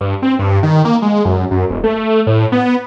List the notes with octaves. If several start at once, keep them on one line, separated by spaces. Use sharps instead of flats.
G2
C4
G2
D#3
A#3
G#3
F#2
F#2
E1
A3
A2
B3